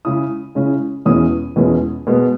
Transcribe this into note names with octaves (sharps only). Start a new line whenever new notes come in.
C#3 G#3 C#4 E4 D#6
C#3 G#3 C#4 E4
E2 B2 G#3 C#4 E4 D#6
E2 B2 G#3 C#4 E4
B2 G#3 B3